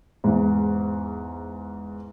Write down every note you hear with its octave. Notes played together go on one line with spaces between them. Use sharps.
E2 G#2